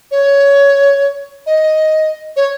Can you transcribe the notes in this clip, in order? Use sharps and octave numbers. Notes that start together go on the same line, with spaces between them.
C#5
D#5
C#5